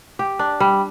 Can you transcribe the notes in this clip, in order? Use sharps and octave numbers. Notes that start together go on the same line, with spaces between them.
G4
D4
G3